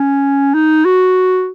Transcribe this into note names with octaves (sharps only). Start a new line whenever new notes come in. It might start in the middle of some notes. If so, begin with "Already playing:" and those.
Already playing: C#4
D#4
F#4